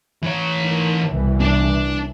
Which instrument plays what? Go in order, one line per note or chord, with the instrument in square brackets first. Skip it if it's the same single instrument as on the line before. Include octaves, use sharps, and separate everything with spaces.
[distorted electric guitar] E3 C#5
[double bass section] D#3
C2 B2 E3
[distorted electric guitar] D4 D5